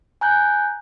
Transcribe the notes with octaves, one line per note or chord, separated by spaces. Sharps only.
G#5 A#5 F#6 G6